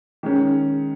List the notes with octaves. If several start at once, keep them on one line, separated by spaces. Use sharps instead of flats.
D#3 G#3 C#4